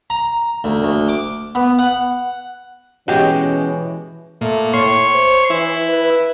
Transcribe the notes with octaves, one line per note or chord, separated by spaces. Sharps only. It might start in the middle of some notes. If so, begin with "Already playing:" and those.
A#5
D2
D2
D6
B3
F#5
B2 E3 G#3 C#4 F#4 G4
A#2 A3
A2 C#5 C6
C5
E3 E4
B4